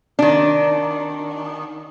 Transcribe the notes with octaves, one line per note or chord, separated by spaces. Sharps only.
D#3 D4